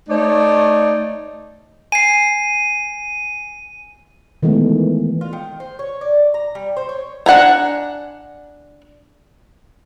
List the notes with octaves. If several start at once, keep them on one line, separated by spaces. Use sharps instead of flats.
A3 D#4 C#5 D5
G#5 C7 D#7
D#3 E3 G#3 A3 B3
F4
D#3
C5
C#5
D5
A#5
G3
C5
C#5
D4 F#5 G#5 A#5